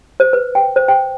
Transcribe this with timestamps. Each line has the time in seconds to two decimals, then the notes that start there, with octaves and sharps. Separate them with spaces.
0.20 C5
0.33 B4
0.55 G5
0.76 C5
0.88 G5